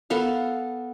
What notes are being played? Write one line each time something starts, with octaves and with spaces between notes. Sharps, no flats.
B3 A4 F5